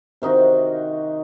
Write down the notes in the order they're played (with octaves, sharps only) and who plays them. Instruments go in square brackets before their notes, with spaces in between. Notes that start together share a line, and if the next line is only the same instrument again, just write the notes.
[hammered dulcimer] C3 D#3 D#4 F#4